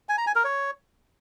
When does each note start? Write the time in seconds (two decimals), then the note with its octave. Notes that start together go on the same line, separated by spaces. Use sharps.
0.09 G#5
0.18 A#5
0.27 G#5
0.36 A#4
0.44 C#5